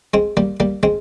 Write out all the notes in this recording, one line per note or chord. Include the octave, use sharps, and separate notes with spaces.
G#3 C4
G3 A#3
G3 A#3
G#3 C4